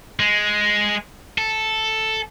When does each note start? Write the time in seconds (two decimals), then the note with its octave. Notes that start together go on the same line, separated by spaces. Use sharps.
0.20 G#3
1.38 A4